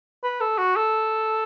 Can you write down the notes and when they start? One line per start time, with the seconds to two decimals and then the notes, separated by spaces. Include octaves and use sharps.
0.23 B4
0.40 A4
0.58 F#4
0.76 A4